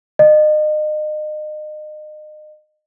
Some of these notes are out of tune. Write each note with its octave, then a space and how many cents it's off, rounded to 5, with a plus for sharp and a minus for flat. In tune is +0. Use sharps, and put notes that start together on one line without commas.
D#5 -35